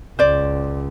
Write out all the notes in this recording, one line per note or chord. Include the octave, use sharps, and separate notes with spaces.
C#2 C5 D5